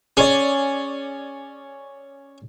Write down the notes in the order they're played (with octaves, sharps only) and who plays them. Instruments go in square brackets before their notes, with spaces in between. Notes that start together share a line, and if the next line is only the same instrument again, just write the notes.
[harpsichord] C#4 [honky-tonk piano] G#4 C#5 D5